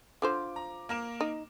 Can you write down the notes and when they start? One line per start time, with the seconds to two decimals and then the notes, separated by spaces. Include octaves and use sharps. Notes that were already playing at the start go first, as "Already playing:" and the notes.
0.22 D3 F3 C5 D6
0.56 A#5
0.89 A#3 A#4 E7
1.21 D#4